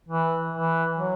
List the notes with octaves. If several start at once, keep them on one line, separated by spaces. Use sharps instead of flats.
E3
E3
F#3